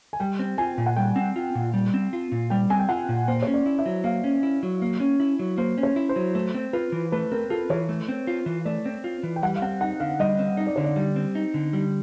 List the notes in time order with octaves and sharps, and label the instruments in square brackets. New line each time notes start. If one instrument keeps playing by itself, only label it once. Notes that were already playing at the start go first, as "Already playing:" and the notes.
[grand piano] G#5
[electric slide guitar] G3 [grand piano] G5
[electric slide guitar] C4
[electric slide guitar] F4 [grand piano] G#5
[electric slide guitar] A#2
[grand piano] F#5
[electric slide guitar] G3 [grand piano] G5
[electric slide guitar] C4
F4
A#2
G3
C4
F4
A#2
[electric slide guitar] G3 [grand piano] G5
[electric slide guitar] C4 [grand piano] G#5
[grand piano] G5
[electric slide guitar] F4 [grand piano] F#5
[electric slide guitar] A#2
[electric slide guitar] A#3 [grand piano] C5
[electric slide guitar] C#4 [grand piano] C#5
[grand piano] D5
[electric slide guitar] E4
[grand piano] E5
[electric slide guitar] F#3
[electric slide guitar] A#3 [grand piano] F5
[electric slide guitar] C#4
E4
F#3
A#3
C#4
E4
F#3
[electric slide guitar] A#3 [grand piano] C5
[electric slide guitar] C#4
[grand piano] C#5
[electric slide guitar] E4
[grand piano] C5
[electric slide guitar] F#3
[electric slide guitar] A3 [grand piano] C5
[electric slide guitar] C4
[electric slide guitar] F4 [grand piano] B4
[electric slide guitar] E3
[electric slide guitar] A3 [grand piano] B4
[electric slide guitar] C4 [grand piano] A#4
[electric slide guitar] F4 [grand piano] A4
[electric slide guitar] E3 [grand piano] C#5
[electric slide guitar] A3
C4
F4
E3
[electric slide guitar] A3 [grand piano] D5
[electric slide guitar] C4
F4
E3
[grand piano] G5
[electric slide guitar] G3 [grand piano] F#5
[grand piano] F5
[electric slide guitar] C4 [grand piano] F#5
[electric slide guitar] D#4 [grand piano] F#5
[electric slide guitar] D3 [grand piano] F5
[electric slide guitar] G3 [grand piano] D#5
[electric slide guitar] C4
[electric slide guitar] D#4 [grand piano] D#5
[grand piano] D5
[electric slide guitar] D3 [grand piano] C#5
[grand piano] D5
[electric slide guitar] G3
C4
D#4
D3
G3